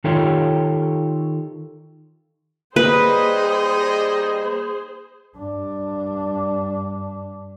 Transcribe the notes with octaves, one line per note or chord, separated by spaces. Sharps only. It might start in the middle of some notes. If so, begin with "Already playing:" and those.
D#3 D#4 F4 G4 A4 C#5
G3 A#3 D#4 G#4 B4 C5 D#5
G2 D4